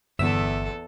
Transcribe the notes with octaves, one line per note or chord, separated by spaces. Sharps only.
G1 E2 A4 E5 E6